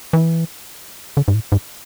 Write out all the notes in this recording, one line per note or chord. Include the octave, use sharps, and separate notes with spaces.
E3
D3
G#2
A2
G#2